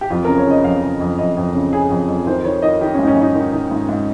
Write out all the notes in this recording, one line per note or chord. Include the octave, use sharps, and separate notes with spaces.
G4
F2 F4
C#3 A#4
C#5
C#3 D#5
F2 F5
C#3
F2
F2 D#5
F2
C#3
C#3 G#4
F2
F2
D#3 C5
D#3 C#5
D#3 D#5
D#3 G4
C#4
G#2 D#4
C#4
G#2
D#4
D#3
D#3
G#2
G#2